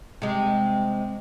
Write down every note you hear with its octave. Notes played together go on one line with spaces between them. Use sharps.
C3 G#3